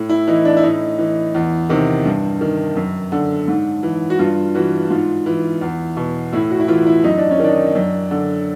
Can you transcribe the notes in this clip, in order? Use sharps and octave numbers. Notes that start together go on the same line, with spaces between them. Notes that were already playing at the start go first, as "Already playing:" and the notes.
Already playing: A2
E4
E3 D#4
D4
E4
A2 D#4
E3
E2
C3 D#3
G2
D#3
F#2
D3
G#2
E3
F#4
G2 F4
E3 F#4
G#2 F4
E3
E2
B2
A2 E4
F#4
E4
E3 F4
E4
F#2 D#4
D4
C#4
D#3 D4
F#2
D3